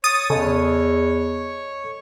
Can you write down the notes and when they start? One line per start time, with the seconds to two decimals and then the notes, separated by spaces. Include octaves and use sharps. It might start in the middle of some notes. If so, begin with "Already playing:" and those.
0.04 C#5 D#6 A6 D#7
0.30 E2 C#3 A4 D#5